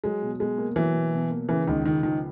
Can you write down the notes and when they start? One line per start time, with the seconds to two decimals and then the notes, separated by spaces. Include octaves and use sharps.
0.04 F#3 G#3
0.22 B2
0.40 B2 G#3
0.58 A#3
0.76 E3 F#3
0.94 B2
1.13 B2
1.30 A#3
1.49 C#3 E3
1.67 C#2 D#3
1.85 C#2 D#3
2.03 D#3 F3